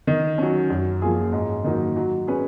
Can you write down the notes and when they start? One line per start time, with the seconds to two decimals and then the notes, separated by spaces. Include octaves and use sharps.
0.07 D#3
0.38 F#3 C#4
0.70 F#2
1.02 F3 A#3 F4 G#4
1.33 G#2
1.64 D#3 F#3 A#3 D#4
1.96 F#3
2.27 C#4 G#4 B4